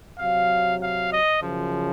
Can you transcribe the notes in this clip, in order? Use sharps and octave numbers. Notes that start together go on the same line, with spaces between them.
C3 F#3 F5
F5
D#5
F#2 C#3 F3